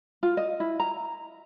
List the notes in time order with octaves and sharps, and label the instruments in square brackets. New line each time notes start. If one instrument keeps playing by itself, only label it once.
[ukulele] F4
D#5
E4
A#5